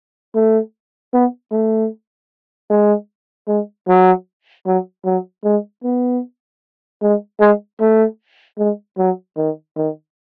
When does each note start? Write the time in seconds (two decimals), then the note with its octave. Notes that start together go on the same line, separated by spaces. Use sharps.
0.35 A3
1.13 B3
1.51 A3
2.70 G#3
3.48 G#3
3.88 F#3
4.66 F#3
5.05 F#3
5.44 G#3
5.84 B3
7.02 G#3
7.40 G#3
7.80 A3
8.58 G#3
8.98 F#3
9.37 D#3
9.76 D#3